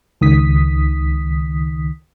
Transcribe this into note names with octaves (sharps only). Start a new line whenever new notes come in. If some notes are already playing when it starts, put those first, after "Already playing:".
C#2 D#3 D#6 B6